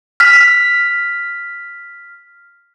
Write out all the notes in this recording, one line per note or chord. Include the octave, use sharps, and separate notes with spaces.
F6 B6